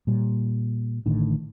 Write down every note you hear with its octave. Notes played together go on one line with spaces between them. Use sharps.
A#2 G3
A1 A2 D3 D#3